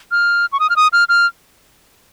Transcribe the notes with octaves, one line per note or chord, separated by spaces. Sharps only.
F6
C#6
D#6
F6
D#6
F6
F6